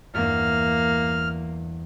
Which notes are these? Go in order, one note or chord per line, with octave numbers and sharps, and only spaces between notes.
E2 G2 A#3 F6